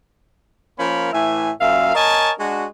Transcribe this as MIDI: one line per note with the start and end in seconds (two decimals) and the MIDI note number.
0.79 1.09 53
0.79 1.09 58
0.79 1.09 61
0.79 1.09 70
0.79 1.09 83
1.13 1.50 45
1.13 1.50 52
1.13 1.50 76
1.13 1.50 80
1.61 1.95 42
1.61 1.95 46
1.61 1.95 76
1.61 1.95 77
1.95 2.30 70
1.95 2.30 73
1.95 2.30 75
1.95 2.30 80
1.95 2.30 81
2.39 2.65 56
2.39 2.65 62
2.39 2.65 66